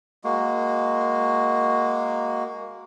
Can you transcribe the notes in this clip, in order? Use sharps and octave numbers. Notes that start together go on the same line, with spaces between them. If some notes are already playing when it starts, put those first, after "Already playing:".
G#3 A#3 F#4